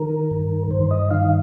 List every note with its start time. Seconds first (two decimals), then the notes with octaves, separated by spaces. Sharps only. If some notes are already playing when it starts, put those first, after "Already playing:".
Already playing: D#3 A#4
0.31 G2
0.71 G2 C5
0.91 D#5
1.11 D#3 F5